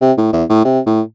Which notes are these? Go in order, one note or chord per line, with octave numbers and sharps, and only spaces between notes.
C3
A2
E2
A2
C3
A2